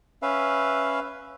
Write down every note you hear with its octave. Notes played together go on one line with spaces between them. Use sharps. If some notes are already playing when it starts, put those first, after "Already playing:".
C#4 B4 E5 F5